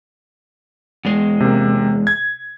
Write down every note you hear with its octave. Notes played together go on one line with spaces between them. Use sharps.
E2 G#3
C3 A#3
G#6